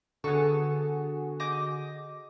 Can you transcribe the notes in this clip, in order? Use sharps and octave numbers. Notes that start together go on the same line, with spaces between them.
D3 B3 F#4 G#4 A4 C#6
D#5 D6 G6